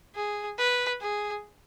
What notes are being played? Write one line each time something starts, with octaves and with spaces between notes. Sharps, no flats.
G#4
B4
G#4